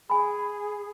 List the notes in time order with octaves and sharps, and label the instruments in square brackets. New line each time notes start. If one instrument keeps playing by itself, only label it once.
[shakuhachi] G#4 [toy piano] G#5 B5